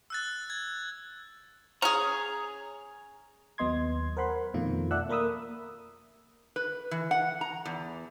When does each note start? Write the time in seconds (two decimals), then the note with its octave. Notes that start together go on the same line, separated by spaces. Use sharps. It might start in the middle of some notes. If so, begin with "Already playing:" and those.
0.10 E6 F#6 A6
0.50 G#6
1.82 C#4 G#4 A#5
3.58 D#2 F#3 B3 D#5 C6 G#6
4.17 A#4 C5 F#5 B5 C6
4.54 F2 B2 D#3 A3 F4
4.91 A4 D5 E5 F#5 E6 F#6
5.09 A#3 A#4 B5 D#6 E6
6.56 B4
6.91 E3
7.11 F#5
7.41 A#5
7.66 E2